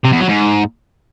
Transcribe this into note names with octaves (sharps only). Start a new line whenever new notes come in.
C3
E2
F#3
G#2